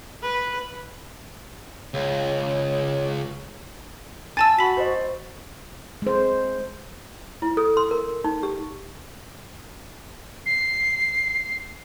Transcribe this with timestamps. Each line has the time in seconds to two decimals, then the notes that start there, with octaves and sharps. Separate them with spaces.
0.23 B4
1.94 C#2 C#5
4.37 G#5 A5 E6 A6
4.59 F#4 B5 B6
4.77 C5 D#5
6.02 G#3 C5
7.42 E4
7.57 A4
7.77 C6
7.91 A#4
8.24 D#4
8.43 G4
10.46 C7